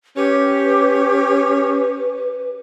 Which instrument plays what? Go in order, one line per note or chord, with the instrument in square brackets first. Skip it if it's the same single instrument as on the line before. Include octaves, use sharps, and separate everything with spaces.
[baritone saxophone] C#4 [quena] G4 [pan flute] B4